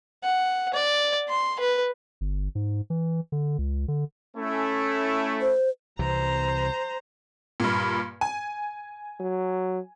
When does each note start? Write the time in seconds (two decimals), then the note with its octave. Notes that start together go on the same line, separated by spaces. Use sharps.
0.23 F#5
0.74 D5
1.29 C6
1.60 B4
2.21 G1
2.55 G#2
2.90 E3
3.32 D3
3.58 C#2
3.88 D3
4.37 A3 C#4 E4
5.42 C5
5.99 C2 C3 E3 C5 A#5
7.60 G2 A#2
8.21 G#5
9.20 F#3